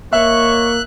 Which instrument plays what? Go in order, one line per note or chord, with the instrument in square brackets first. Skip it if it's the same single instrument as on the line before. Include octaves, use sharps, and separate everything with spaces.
[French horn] A#3 [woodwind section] C#5 D#5 C#6 [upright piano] E5 [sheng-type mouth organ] F#6